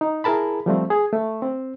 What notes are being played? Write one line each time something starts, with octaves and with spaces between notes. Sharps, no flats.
D#4
E4 G#4 A#4 A5 B5
F3 G3 A3 C4
G#4
A3
C4